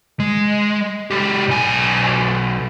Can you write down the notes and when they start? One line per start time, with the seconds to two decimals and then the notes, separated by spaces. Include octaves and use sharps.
0.20 G#3
1.11 G#3 G4
1.48 B1 G#5